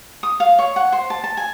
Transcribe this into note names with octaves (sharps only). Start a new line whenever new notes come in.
D#6
F5
C#5
F#5
C5
A5
A5
G#5